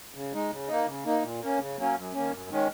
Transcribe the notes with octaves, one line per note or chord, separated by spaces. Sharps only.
C#3
G#3 D#4
C#3
A#3 D#4
C#3
A#3 D#4
A#2
A#3 C#4
C#3
F#3 A#3 C#4
F#2
D#3 A#3 C#4
F#2
D#3 G#3 C#4